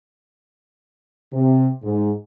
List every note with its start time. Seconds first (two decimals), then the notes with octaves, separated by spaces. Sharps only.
1.33 C3
1.83 G#2